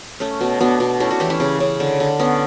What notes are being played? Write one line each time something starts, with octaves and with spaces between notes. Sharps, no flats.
A3 C#4
B2
B2 B3 D4
B2
A3 C#4 E4
D4 F#4
E3 E4 G4
C#4 E4
C#3
C#3
D3
D3
B3 C#4